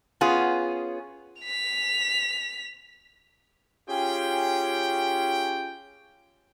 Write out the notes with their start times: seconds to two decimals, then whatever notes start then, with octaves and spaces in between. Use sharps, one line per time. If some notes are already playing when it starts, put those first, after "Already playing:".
0.21 B3 C#4 F4 G#4
1.42 B6 F7
3.89 C#4 F4 G4 G#4 G5